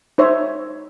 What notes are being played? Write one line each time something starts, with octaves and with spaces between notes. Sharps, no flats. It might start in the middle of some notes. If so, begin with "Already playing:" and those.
D#4 C5 C#5 E5